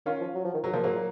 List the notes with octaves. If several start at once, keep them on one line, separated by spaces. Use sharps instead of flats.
D#3 C#4 F4
F3
F#3
F3
D#3
G#2 F#3
A#2 F3
G#2 F#3 A#3
A#2